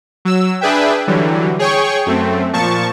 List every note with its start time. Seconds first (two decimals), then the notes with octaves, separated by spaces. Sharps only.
0.25 F#3 E6
0.61 D4 G#4 B4 E5 G5
1.07 D3 E3 F#3 G3
1.59 G#4 C#5 G5 C#6
2.06 F#2 A3 C4
2.53 A#2 F3 A5 C#6